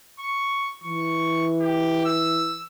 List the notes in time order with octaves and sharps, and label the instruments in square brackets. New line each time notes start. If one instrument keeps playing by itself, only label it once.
[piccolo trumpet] C#6
[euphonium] E3 [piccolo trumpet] C#6
[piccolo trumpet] G4
E6